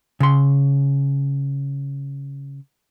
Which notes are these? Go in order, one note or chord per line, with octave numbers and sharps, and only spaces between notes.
C#3 C6